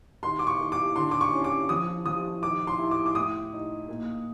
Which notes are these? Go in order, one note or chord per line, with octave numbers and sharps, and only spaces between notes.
D#3 C6
D6
C#6
D#3
D6
D3 C6
D6
C#6
C#4
D6
F3 D#6
F3 D#6
D#3 D6
C6
E4
D6
D6
A2 D#6
D#4
A#2